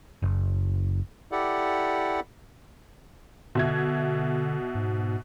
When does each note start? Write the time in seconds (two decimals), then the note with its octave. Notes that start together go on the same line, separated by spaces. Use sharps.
0.22 F#1
1.32 E4 G4 A4 D5 F#5
3.55 B2 D3 E5 G#6
4.75 G#2